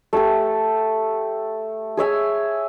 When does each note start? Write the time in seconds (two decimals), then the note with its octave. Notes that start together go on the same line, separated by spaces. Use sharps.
0.13 A3 G4 A4
1.97 G#4 C#5 E5 G#5